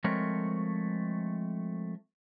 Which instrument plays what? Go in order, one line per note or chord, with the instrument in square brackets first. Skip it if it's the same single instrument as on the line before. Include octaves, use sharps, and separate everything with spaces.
[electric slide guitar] F3 G#3 A3 C4 A#4 C#5